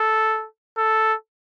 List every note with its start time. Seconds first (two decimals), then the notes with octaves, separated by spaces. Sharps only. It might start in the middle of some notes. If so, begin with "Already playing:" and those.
Already playing: A4
0.78 A4